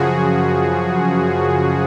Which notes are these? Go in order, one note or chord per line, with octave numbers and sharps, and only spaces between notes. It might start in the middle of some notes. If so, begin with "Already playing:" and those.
Already playing: F#2 C#3 F3 F#4 G#4